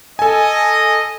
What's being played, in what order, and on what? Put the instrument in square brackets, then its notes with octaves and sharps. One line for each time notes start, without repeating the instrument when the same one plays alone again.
[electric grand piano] A4 G#5 [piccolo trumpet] D#5